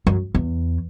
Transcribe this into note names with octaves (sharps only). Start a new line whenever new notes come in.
F#2
E2